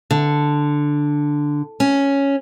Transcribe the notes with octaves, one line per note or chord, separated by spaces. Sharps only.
D3
C#4